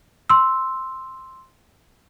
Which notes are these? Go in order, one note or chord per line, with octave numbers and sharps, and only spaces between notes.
C6 E6